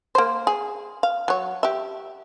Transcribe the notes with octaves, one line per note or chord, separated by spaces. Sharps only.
A#3 C5
G#4
F5
F#3 C#5
G4 E5